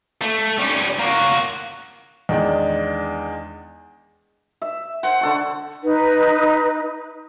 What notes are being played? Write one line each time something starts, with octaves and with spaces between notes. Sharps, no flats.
A3
G3 C#4
A#3 F#4
E2 D#3 G#3 D4 D#4 G5
E5
C5 F#5
D3 A4 C#6
D#4 B4